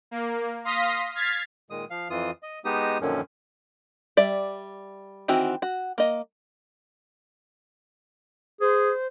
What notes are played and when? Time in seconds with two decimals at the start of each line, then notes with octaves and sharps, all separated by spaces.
0.11 A#3
0.64 F5 C6 D#6 A#6 B6
1.15 F6 G#6 A6 B6 C7
1.70 A#2 D#3 G#3 D#6
1.90 F3 F5
2.10 F2 E3 F4 D#6
2.43 D#5
2.65 G#3 B3 D#4 G4 D#6
3.01 F#2 A#2 D3 D#3 F3 C#4
4.17 G3 D5 E5
5.28 D#3 E3 C4 F#4
5.62 F#4
5.98 A#3 D#5
8.61 G#4 C5